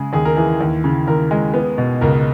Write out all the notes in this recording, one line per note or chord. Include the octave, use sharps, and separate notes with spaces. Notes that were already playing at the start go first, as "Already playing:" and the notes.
Already playing: C#3 G#3 G#4
D#2 G#4
A#4
E3 G#4
D#2
C#3
D#2 A#4
G#3
B3
B2
C#2 A#4